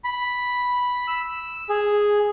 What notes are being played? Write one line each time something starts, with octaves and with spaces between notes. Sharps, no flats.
B5
E6
G#4